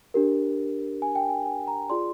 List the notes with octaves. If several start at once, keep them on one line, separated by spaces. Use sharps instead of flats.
D4 G4 A#4
G#5
G5
G#5
G#5
A#5
F4 G#4 D5 C6